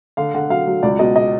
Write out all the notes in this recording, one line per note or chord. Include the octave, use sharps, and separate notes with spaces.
D3 F5
D3 F#5
F#3 F5
F#3
C#2 D5
B2 D#5
D#5